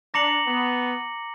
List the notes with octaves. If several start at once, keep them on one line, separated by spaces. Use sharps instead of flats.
D4 A#5 D6 A#6 C#7 F#7
B3